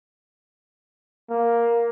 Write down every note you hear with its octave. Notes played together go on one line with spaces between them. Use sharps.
A#3